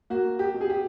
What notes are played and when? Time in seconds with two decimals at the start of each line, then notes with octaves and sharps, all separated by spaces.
0.10 A#3 F#4
0.39 G4
0.54 B2
0.61 G#4
0.70 G4